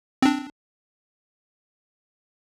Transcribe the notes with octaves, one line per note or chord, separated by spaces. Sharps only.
C4 D4